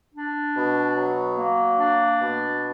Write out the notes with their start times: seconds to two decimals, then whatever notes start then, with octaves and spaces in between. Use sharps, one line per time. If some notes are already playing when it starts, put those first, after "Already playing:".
0.14 D4
0.56 B2
0.96 F#3
1.37 A#3
1.78 D4
2.19 B2